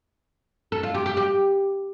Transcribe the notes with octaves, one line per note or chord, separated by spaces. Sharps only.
A4
F4
G4
G4
G4